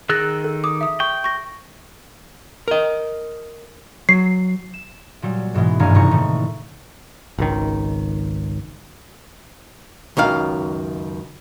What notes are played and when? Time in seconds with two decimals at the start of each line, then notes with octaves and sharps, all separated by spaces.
0.09 D#3 G#4 E6 F#6 A6 A#6
0.44 A4
0.64 D6 D#6
0.81 E5 D#6
1.00 G5 C#6
1.24 C#6 A#6
2.68 A#4 D#5
4.09 F#3 C7
4.74 E7
5.22 A#2 F#3 G3
5.54 G#2 B2 E3 G#3
5.79 D#1 G#1 G2 F5 G#5 A#5
5.95 E2 A2 C3 A#5 C#6
6.11 A2 D#3 A3
7.38 G#1 C#2 D#3
10.17 C#2 F#2 D#3 F5